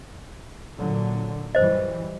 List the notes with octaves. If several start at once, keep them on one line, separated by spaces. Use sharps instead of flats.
A#2 D3 F#3
F#2 E3 G3 C5 D#5